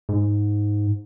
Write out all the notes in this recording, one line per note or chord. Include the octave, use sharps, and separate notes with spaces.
G#2